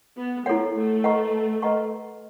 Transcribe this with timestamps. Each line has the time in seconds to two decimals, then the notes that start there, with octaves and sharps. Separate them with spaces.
0.17 B3
0.46 A3 E4 A4 C#5 F#5
0.75 A3
1.04 B4 D#5 F#5 A#5 C#6
1.62 B4 D#5 F#5 A#5 C#6